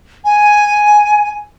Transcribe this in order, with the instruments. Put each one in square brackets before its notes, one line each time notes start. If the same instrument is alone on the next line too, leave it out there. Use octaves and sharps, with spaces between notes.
[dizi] G#5